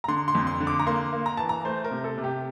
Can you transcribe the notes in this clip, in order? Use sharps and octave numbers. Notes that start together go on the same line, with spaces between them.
A#5
D3 C6
C6
F2
C6
D3
D6
A#5
A#3 C6
A#3
A#5
E3 A5
A#5
A3 C5
A#4
C3
A4
C3
G4